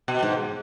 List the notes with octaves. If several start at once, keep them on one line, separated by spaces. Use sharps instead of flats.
B2
G#2